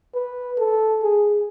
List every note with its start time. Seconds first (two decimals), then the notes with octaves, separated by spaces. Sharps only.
0.15 B4
0.59 A4
1.03 G#4